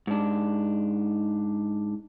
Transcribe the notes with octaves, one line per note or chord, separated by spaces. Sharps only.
G#2 D4